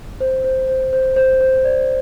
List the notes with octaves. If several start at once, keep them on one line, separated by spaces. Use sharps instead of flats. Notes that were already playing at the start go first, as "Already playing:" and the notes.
C5
C5
C5
C5
C5
C5
D5